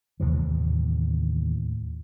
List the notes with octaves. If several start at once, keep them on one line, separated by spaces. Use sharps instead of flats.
D#2 A2 C3 E3